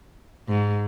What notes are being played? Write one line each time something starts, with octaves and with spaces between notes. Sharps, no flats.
G#2